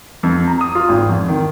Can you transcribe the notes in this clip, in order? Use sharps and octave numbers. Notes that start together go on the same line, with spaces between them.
F2
A#5
D#6
F4
G#1
F2
D#3